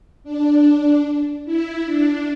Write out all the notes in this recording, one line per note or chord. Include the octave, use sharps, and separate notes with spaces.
D4
E4
D4